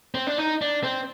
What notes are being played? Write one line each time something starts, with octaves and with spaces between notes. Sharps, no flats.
C4
D4
D#4
D4
C4